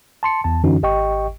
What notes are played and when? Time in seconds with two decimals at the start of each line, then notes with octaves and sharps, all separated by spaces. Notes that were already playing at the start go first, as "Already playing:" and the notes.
0.23 A5 C6 C#7
0.44 E2 A5
0.63 F#2 D3 E3 C#4 D#4 F#4
0.83 G#1 G4 D#5 G5 C#6